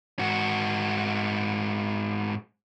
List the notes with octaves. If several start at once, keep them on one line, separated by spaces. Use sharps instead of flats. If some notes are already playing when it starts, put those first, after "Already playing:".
G#2 F#4